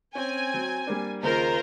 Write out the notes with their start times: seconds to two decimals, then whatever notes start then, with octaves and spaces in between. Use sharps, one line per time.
0.15 C4 C#4 G#5
0.54 F#3
0.87 G3 A#3 D4
1.23 D#2 C#3 F4 A#4 C5